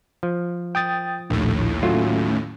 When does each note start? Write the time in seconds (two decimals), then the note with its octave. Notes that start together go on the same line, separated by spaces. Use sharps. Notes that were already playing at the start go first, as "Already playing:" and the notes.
0.23 F3
0.75 G5 D#6 A6
1.30 A#1 D#2 A2
1.83 F#3 A3 C#4 F4